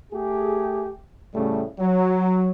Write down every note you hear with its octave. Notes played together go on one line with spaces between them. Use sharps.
A3 G4 G#4
A2 C#3 G3 A3
F#3